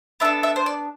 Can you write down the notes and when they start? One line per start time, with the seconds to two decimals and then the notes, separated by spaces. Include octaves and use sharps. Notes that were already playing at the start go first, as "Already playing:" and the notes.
0.20 B3 D4 A4 E5
0.43 E5
0.56 C5
0.66 D5